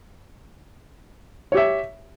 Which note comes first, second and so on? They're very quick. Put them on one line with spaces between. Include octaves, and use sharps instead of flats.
C#5 G4 E5